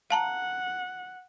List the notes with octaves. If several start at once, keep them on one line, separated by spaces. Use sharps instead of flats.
F5 F#5 A5 A#5